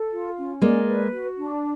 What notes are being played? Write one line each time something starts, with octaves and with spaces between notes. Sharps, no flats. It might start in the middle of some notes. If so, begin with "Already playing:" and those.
Already playing: A4
F4
C#4
G#3 A#3 D5
B4
F#4
D4